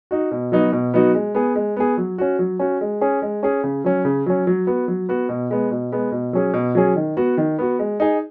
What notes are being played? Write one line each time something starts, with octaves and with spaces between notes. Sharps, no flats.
D#4 F#4
B2
F#3 B3 D#4 F#4
B2
F#3 B3 D#4 F#4
G#3
B3 G#4
G#3
B3 G#4
F#3
C#4 F#4
F#3
C#4 F#4
G#3
C#4 G#4
G#3
C#4 G#4
C#3
F#3 C#4
C#3
F#3 C#4
F#3
B3 F#4
F#3
B3 F#4
B2
G#3 B3
B2
G#3 B3
B2
F#3 C#4 G#4
B2
F#3 C#4 G#4
D#3
B3 F#4
D#3
B3 F#4
G#3
D#4 G#4